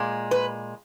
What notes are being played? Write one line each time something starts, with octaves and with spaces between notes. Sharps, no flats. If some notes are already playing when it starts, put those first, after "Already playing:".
Already playing: A#2 G#3
B4